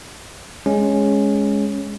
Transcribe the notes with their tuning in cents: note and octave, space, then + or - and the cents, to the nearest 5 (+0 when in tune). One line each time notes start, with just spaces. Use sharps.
G#3 +0 C#4 +0